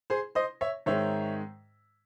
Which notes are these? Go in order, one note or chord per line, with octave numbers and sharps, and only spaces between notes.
G#4 C5
C5 D#5
C#5 E5
G#2 D#3 G#3 C4 C#5 E5